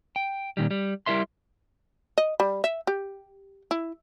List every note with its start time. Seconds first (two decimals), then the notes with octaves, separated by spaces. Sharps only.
0.16 G5
0.57 A#2 D#3 G3
0.71 G3
1.06 G3 E4 A#4 E5 C6
2.18 D#5
2.40 G3
2.64 E5
2.87 G4
3.71 E4